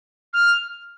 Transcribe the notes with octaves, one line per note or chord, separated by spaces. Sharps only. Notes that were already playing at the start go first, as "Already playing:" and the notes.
F6